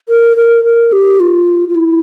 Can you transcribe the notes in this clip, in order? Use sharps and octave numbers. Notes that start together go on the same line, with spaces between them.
A#4
A#4
A#4
G4
F4
F4
E4